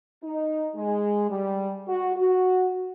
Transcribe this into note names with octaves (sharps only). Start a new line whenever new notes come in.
D#4
G#3
G3
F#4
F#4